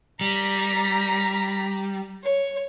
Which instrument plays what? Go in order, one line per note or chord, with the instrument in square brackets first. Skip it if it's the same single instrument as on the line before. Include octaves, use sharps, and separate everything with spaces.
[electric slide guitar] G3 [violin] A#5 B6
[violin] C#5